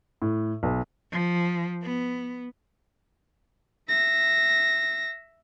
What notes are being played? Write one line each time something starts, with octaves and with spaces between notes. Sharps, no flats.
A2
B1
F3
B3
E5 A#6